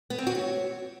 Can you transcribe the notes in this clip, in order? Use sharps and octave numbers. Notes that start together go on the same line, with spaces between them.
B3
C4
F#4
C#5